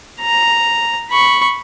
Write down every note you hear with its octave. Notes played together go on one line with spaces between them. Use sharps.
A#5
B5 C#6